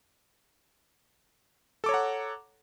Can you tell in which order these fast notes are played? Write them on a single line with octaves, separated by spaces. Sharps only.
A4 D6 C#5 A#5 F#5